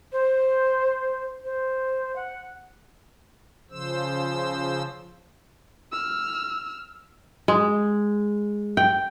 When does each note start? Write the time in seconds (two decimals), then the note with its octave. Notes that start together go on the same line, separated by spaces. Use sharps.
0.12 C5
1.44 C5
2.15 F#5
3.71 C#3 F3 C5 E6
5.92 E6 F6
7.48 G#3
8.77 G5